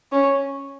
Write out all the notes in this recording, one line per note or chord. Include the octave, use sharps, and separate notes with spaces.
C#4